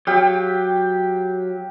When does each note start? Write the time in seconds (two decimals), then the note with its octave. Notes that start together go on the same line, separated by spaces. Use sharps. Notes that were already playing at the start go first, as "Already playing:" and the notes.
0.07 F#3 G4 F5 G5